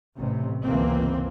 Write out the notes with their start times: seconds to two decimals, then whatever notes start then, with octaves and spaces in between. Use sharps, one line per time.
0.17 A1 C3
0.64 G1 C#2 E3 A#3 C4